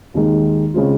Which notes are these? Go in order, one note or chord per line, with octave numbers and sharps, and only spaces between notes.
D#2 D#3 G#3
C#3 G#3 C4 F4